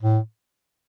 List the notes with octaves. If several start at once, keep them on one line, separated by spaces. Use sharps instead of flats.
A2